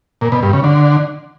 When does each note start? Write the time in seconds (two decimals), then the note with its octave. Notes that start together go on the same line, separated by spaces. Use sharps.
0.21 A#2
0.32 B2
0.43 G2
0.53 C#3
0.64 D3